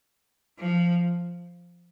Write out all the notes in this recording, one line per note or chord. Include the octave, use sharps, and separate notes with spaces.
F3